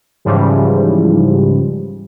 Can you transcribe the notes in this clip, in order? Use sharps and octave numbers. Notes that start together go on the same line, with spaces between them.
G#2 C#3 E3 F3 G3